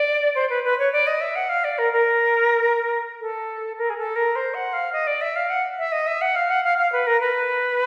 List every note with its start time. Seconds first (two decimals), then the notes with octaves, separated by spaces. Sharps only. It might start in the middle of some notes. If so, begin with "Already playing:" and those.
Already playing: D5
0.35 C5
0.49 B4
0.64 B4
0.78 C#5
0.92 D5
1.06 D#5
1.21 E5
1.35 F#5
1.49 F5
1.64 D5
1.78 A#4
1.92 A#4
3.21 A4
3.78 A#4
3.89 G#4
3.97 A4
4.15 A#4
4.35 C5
4.54 F#5
4.73 F5
4.92 D#5
5.07 D5
5.21 E5
5.35 F5
5.49 F#5
5.78 E5
5.92 D#5
6.06 E5
6.21 F#5
6.35 F5
6.50 F#5
6.63 F5
6.77 F5
6.92 B4
7.06 A#4
7.20 B4